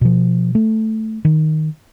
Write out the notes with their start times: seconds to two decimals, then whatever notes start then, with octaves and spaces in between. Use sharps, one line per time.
0.01 B2 F3
0.55 A3
1.25 D#3